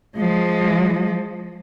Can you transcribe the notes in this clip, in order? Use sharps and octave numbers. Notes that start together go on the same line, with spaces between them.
F3 G#3